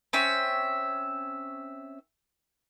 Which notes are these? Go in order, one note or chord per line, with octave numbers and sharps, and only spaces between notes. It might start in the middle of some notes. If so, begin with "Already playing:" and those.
C4 C#4 E5